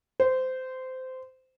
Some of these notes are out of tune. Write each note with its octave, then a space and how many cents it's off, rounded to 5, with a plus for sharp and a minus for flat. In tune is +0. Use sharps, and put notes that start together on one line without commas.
C5 -20